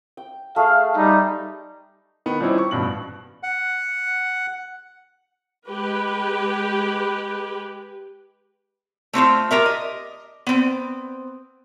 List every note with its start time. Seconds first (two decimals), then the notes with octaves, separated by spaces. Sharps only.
0.17 G5
0.56 A3 G#4 A4 F5
0.96 G3 D#4
2.26 D#3 B3
2.40 F3 G3 C4 C#4 D#4 E4
2.58 C#6
2.71 A1 G2 B2 F#7
3.43 F#5
5.68 G#3 G4 B4
9.13 A3 C4 D#4 F4
9.51 F4 G4 A#4 E5
9.66 D#5
10.47 B3 C4